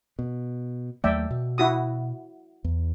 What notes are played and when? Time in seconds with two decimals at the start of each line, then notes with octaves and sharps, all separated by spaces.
0.19 B2
1.04 D#2 F#3 A3 D5 E5 G5
1.30 B2
1.58 E4 F#4 D#6
2.64 E2